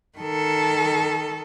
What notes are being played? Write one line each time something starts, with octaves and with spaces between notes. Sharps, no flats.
D#3 A4